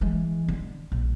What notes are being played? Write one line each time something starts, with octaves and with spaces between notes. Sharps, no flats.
E3 G#3
D3
A#1